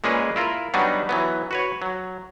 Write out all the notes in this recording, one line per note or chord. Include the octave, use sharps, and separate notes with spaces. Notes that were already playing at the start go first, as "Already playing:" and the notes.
A#2 G#3 A#3 C#4 G#4 B4
E4 F4 A#4
F#3 G3 B3 D4 D#4 F#4
E3 F#3 B3
F#4 B4 C#5
F#3